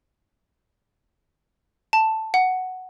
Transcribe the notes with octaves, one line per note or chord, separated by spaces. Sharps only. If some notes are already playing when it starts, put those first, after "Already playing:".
A5
F#5